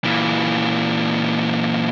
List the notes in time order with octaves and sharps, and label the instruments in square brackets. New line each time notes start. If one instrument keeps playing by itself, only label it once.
[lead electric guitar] A#2 E3